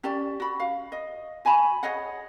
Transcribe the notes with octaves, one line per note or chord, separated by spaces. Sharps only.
C#4 G4 D5 A5
F#4 B5
F5
D#5
F#4 G#5 A5 B5
G#4 C#5 D#5 F#5